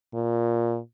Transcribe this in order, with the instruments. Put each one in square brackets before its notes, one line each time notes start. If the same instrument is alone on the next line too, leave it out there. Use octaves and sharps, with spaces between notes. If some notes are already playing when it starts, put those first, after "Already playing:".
[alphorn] A#2